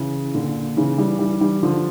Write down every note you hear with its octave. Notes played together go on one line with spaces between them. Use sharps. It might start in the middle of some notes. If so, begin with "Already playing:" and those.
Already playing: C#3 E3
A#2 D3
C#3 E3
E3 G3
E3 G3
E3 G3
D3 F3